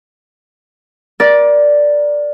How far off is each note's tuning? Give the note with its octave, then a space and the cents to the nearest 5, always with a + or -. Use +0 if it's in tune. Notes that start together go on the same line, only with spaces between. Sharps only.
A#4 +30 D5 +0